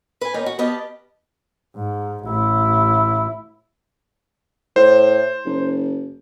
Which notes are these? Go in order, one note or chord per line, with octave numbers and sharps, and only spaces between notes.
B4 G#5
D#3 A#3 B3 C#4 D#4
F#4
B3 G4 D#5 F5 A5
G#2
A1 E4
A2 C5
F#1